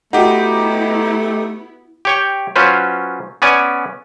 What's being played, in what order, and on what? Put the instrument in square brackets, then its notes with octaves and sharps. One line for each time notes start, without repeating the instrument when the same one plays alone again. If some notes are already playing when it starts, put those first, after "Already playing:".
[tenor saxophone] A3 [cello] B3 E4 [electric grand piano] D#4 G4 [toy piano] F#4 F#5
[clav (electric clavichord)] G4 C#5 G5
F#3 C#4 F4 B4 C5
B3 C#4 D5 G#5